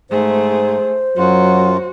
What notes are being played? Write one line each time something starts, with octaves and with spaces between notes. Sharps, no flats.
G#2 A3 G#4 C5
F#2 F#3 F4 F#4